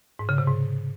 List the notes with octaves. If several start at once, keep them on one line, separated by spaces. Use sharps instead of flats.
G#2
C#3
C3
G#2